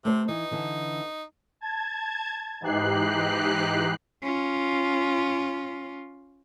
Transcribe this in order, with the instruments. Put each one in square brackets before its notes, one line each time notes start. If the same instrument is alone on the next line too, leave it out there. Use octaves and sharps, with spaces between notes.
[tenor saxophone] C3 [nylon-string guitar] A3 C5
[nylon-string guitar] E3 [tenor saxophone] D#4
[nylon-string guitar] D3 E3
[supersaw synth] A5 G#6
G#2 E3 D#4 G4 F#6 C7
[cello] C#4 F4